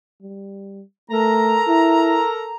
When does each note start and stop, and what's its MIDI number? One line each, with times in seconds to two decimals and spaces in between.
0.22 0.82 55
1.11 1.59 57
1.11 2.57 69
1.11 2.57 70
1.11 2.57 82
1.68 2.23 64